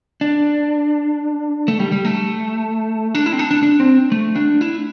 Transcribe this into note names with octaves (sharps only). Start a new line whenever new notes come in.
D4
A3
G3
G3
A3
D4
E4
C4
D4
D4
D4
C4
A3
D4
E4